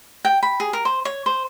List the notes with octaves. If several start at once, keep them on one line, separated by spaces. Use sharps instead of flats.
G5
B5
G#4
A#4
C5
C#5
C5